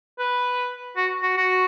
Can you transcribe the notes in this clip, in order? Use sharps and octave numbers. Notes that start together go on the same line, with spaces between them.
B4
F#4
F#4
F#4